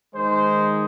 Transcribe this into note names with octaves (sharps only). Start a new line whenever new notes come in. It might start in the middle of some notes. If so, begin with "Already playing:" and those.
D#3 G#3 D#4 C5